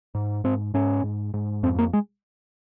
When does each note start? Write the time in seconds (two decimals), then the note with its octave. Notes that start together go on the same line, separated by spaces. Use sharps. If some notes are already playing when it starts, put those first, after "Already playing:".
0.15 G#2
0.44 G#2 C4
0.74 G#2 C#4
1.04 G#2
1.34 G#2
1.63 F2 C4
1.79 A#3
1.93 G#3